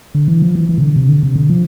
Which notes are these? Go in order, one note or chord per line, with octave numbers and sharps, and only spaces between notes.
D3
E3
F3
E3
E3
C3
D3
C3
D3
C3
D3
F3